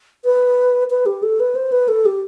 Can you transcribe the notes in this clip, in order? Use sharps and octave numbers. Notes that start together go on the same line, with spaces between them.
B4
B4
G4
A4
B4
C5
B4
A4
G4